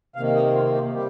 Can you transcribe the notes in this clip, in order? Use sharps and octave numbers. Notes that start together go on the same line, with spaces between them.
C3 D#3 A#3 F5
D#5
F4
G4
C3 G3 G4